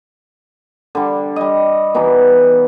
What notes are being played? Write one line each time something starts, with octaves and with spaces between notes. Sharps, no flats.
D3 G3
G3 D#5
B2 E3 D#4